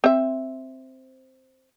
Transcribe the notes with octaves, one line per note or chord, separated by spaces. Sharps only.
C4 E5